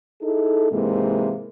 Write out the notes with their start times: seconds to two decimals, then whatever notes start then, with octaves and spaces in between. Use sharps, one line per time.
0.22 D#4 E4 G#4 A4
0.71 G#2 C3 E3 G#3 A#3